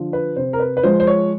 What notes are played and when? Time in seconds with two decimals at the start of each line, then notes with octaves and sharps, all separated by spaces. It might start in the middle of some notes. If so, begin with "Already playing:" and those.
Already playing: D3 F3
0.13 B4
0.36 C3 C5
0.53 A#4
0.60 B4
0.77 B4
0.83 F3 G#3 C5
1.00 C5
1.07 C#5